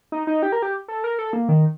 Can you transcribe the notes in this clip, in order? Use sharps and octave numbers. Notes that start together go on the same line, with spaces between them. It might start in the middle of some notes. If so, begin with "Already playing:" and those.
D#4
D#4
G4
A#4
G4
A4
A#4
A4
A#3
D#3